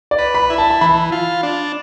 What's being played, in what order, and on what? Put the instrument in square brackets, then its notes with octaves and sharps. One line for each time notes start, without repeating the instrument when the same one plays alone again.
[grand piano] D5
[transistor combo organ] B4
[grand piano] B5
[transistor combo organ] E4
[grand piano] A5
A5
[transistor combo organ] E3 [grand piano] B5
[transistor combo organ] F4
D4